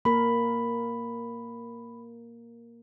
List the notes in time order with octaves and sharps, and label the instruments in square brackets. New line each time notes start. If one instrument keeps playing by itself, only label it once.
[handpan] A#3 A#4 [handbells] B5